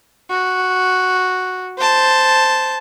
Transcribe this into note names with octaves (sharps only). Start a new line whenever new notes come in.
F#4
C5 A5